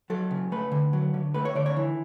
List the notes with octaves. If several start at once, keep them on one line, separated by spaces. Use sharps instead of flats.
F#3 A4
C#3
A3 B4
D3
F#3
D3
A3 B4
C#5
D3 D5
C#5
E3